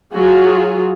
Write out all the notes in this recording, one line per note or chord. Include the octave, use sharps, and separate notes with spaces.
F#3 F4 F#4 G#4